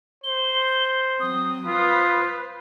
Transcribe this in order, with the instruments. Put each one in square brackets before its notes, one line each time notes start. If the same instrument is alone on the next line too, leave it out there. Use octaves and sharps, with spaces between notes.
[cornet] C5 [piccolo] G7
[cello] F#3 C4 [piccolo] D#6
[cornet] F4 [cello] B4 C5